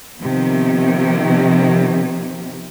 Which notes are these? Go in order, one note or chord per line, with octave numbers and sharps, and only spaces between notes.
C3 D#3 F3 B3